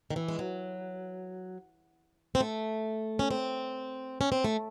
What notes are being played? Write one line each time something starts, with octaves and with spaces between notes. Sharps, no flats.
D#3
E3
G#3
F#3
C4
A3
C#4
C4
C#4
C4
A3